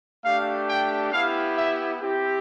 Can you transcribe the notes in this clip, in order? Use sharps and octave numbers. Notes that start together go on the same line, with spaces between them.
A3 D4 G4 F5
G5
B3 E4 G4 F5
E5
C4 E4 G4